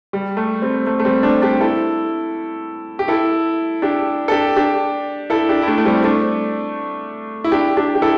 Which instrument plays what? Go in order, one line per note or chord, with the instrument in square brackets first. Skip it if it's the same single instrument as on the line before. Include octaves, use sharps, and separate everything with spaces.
[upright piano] G3
A3
G3 C4
A3
A3
G3 C4
A3 D4
D4 G4
E4 A4
G4
E4 A4
D4 G4
A4
D4 G4
D4 G4
E4 A4
D4 G4
E4
A3 D4
A3
G3 C4
C4
A3 D4
E4
D4 G4
D4 G4
G4
E4 A4